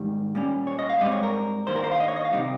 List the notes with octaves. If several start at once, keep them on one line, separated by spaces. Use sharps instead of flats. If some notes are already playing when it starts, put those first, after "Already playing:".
Already playing: G#2 D#3 G3
A#2 G3 C#4
C#5
D#5
F5
G#2 G3 C4 D#5
C#5
A#4
G2 D#3 G3 A#3 C5
A#4
C5
F5
D#5
C#5
D#5
F5
C3 G3 C4 D#4 D#5